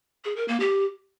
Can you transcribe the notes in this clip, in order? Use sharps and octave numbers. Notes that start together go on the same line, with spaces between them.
G#4
A#4
A#3
G4